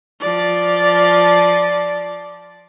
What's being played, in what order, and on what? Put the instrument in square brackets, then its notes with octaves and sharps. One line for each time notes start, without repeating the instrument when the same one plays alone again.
[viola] F3 D5